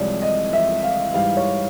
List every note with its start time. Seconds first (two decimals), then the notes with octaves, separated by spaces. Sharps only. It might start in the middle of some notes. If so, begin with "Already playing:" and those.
Already playing: C2 C3 F3 G#3 C4 C#5 D5
0.22 D#5
0.53 E5
0.83 F5
1.14 G#2 E3 G3 F5
1.37 C#5